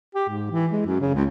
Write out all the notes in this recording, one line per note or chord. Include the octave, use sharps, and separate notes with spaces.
G4
G#2
E3
G#3
F#2
C#3
C#2